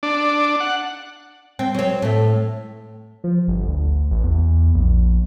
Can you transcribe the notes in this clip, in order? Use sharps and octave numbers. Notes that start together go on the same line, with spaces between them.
D4
F#5
C4
F#3 C4
A2 A3
F3
G1
D2
A1
E2
A#1